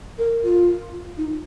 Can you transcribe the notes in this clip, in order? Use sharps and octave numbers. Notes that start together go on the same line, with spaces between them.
A#4
F4
D#4